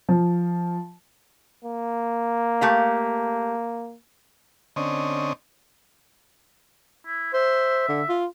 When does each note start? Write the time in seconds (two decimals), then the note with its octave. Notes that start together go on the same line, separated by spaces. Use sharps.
0.09 F3
1.64 A#3
2.61 A3 G4 F5
4.76 D3 C4 C#4 D#5
7.06 E4
7.34 C5 E5
7.89 D3
8.09 F4